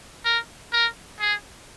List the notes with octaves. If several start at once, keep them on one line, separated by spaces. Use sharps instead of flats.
A#4
A#4
G#4